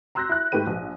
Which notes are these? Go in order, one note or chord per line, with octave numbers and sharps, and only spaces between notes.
A#5 C6 E6 F#6 G6 A#6
E4 F#6
G#2 A3 G4 B4 D#7
A#1